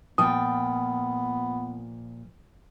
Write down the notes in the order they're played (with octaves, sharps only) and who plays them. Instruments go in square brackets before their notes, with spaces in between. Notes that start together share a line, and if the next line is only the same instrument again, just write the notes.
[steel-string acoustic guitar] A#2 F3 G5 [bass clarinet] B3 [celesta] D#6